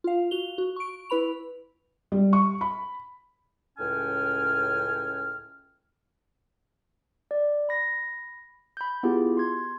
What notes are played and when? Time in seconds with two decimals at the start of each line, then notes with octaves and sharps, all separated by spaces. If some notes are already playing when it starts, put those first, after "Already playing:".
0.04 F4 F5
0.31 F#4 F7 G7
0.58 F#4
0.76 C#6 D7
1.10 E4 B4 B5 F7
2.12 G3
2.33 C#6
2.61 B5
3.78 C#2 A2 C#4 G5 G#5 F6
7.31 D5
7.69 B5 A#6
8.77 B5 G6
9.03 B3 E4 F4 G4 G#4
9.37 C6 G#6